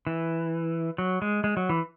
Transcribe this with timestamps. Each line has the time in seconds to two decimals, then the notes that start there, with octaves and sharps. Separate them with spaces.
0.07 E3
0.98 F#3
1.22 G#3
1.44 G#3
1.57 F#3
1.69 E3